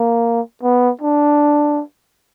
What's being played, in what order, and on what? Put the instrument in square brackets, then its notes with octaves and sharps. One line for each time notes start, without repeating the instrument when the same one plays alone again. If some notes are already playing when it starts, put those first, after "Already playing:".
Already playing: [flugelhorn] A#3
B3
D4